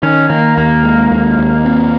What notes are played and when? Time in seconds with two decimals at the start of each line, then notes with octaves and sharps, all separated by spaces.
0.03 D#3 C#4
0.29 D#3 A#3
0.57 D#2 A#3
0.83 G#3
1.11 D#2
1.38 D#2
1.65 C4